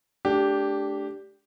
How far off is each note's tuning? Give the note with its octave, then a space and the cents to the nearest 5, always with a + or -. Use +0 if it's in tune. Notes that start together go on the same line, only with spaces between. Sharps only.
A3 -30 D4 -15 G4 +0